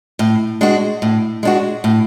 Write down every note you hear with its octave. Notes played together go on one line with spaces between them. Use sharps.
A2
G#3 D4 F#4
A2
G#3 D4 F#4
A2